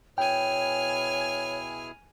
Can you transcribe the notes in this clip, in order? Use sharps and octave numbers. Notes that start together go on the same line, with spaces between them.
B2 E4 G#4 C#5 G5 G#5 F6